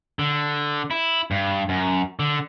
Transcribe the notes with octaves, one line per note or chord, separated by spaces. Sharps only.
D3
E4
G2
F#2
D3